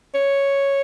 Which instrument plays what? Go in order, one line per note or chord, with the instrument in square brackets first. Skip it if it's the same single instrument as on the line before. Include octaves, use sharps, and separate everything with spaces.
[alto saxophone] C#5